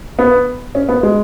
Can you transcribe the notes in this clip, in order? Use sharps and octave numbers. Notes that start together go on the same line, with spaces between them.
B3
C#4
B3
G#3